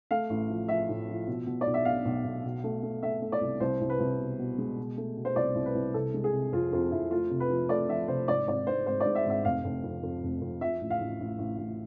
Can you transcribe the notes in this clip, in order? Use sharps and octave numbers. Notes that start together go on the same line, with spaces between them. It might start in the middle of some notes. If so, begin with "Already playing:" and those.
A3 F5
A1
F3
F3 E5
A2
F3
B2
B2
D5
B1
E5
B1 F5
B1
B1
B2
A3
A3
A3 E5
A3
D5
C2
C2 C5
C2
B4
C2
B2
B2
G#3
B2
A3
B2
C5
C2 D5
C2
B4
C2
C3 A4
G#3
G#4
C3
F2 F4
F2 F4
F2 E4
A3 F4
C3
B4
F3
A3 D5
F3 E5
C3 C5
G#2 D5
G#1 D5
G#2 C5
G#1 C5
G#2 D5
E5
G#1 E5
F1 F5
F1
F2
F2
F1
F2
F3 E5
A1
F5
A1
A1
A1
A1